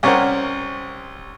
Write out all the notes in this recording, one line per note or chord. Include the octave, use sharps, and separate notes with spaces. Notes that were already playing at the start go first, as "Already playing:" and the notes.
C2 C#4 A#4 C5 F#5